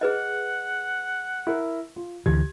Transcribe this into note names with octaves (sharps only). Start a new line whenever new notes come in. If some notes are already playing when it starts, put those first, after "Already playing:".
G#4 B4 D#5 F#5
E4 A#4
F4
D2 D3 E3 G4 G#6